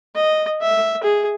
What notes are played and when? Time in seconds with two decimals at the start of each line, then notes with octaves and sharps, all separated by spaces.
0.15 D#5
0.61 E5
1.03 G#4